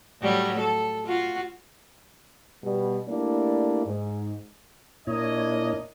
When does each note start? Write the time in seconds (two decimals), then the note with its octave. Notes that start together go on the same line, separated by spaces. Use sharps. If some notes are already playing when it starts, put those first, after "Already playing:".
0.22 A2 F#3 G3
0.59 A4
1.06 F4 F#4
2.63 B2 G3
3.08 A3 A#3 D4 E4 G4 D5
3.85 G#2
5.07 A#2 D4 E4 A#4 C#5 D#5